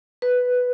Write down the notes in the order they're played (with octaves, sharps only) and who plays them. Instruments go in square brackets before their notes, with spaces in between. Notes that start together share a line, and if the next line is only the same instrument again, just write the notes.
[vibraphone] B4